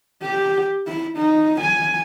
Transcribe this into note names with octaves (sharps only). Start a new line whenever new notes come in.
G4
E4
D#4
G#5